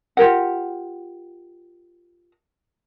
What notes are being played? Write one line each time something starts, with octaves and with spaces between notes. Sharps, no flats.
F4 G4 A#4 F#5